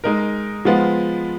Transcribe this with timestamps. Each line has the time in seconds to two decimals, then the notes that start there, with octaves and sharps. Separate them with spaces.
0.04 G#3 D#4 A#4
0.65 F3 G#3 B3 F4